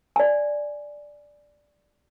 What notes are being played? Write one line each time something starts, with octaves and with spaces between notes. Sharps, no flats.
D5 G#5